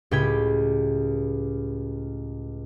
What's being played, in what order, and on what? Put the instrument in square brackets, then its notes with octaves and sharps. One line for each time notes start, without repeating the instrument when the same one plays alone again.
[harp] C#2 A2 G4 G5 B5 G#6